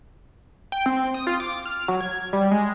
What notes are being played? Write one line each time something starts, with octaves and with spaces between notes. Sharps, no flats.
G5
C4
D#6
F4
D6
F6
F#3
G#6
G3
G#3